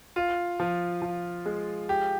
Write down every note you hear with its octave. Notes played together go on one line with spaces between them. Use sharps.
F4
F3
F3
G#3
G4